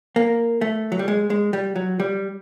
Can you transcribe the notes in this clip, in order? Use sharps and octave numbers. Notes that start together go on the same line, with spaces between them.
A#3
A3
F#3
G3
G#3
G#3
G3
F#3
G3